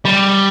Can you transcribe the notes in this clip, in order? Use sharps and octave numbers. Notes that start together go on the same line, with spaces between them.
G3